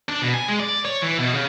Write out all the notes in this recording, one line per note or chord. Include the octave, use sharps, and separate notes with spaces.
D4
B2
G#5
G#3
D5
C#5
E3
B2
C#3